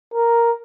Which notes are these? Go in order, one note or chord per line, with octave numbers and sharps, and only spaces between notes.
A#4